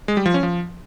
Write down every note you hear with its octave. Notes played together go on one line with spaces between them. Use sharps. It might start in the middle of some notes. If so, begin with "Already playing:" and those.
G#3
G3
F3
C#4
F3